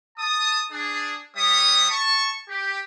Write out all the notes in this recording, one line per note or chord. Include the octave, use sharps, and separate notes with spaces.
A5 D#6
D4 G#4
G3 C#5 E5 D#6
A5 C#6
G4